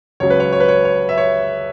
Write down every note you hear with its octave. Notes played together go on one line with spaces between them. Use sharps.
C#2 C#3 F#3 C#5
B4
C#5
C#5
B4
C#5
C#5
E5
C#5